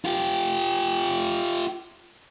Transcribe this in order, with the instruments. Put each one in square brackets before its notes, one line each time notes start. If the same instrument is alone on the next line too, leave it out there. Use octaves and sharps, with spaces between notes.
[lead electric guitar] F4 G4